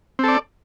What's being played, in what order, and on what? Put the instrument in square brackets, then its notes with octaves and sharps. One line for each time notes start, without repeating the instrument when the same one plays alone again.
[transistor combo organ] C4
A4
D5